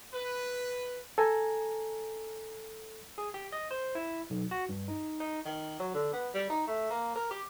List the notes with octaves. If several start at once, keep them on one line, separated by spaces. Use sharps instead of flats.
B4
A4 G#5 A#5
G#4
G4
D#5
C5
E4
B1
F#4
G2
D#4
D#4
D#3
F#3
D3
B3
G3
D#4
A3
A#3
A#4
G4